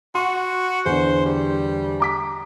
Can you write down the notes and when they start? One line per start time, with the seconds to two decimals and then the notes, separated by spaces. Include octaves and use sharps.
0.15 F#4 C6 C#6
0.86 E2 D3 C5
1.25 G3
2.00 A#5 D6 B6